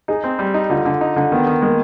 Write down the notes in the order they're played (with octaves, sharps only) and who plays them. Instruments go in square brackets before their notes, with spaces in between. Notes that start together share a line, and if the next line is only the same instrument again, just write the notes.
[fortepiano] D#4 [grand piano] G#4
[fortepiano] C4
G3
D#4
[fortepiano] D3 [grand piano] F4
[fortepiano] D3
D#4
D3
[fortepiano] D#3 [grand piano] B3
[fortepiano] D#3
[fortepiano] G#3 [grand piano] A#3